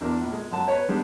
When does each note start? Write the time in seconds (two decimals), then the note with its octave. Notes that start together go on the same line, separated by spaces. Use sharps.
0.01 E2 D4 A#4 D5
0.21 A#1
0.33 G#3
0.51 F#2 F#3 A5
0.68 B4 C#5
0.88 D#3 G3 G#3 B3 D4